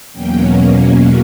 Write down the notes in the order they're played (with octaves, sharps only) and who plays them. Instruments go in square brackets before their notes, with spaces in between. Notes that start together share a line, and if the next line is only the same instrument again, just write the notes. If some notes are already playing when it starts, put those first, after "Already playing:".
[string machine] E2 B2 F#3 A#3 C#4 G5